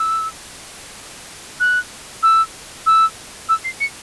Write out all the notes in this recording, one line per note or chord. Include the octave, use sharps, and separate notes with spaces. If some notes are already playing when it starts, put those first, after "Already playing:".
Already playing: E6
F#6
E6
E6
E6
C7
C#7